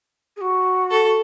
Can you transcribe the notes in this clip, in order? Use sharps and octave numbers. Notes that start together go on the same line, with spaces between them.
G#4
F#4
A4